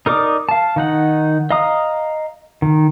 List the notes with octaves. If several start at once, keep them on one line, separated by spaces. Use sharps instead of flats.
D#4 A#4 D5 D6 D#6
F5 A5
D#3 D#4 F#5
D#5 F5 A#5 D#6
D#3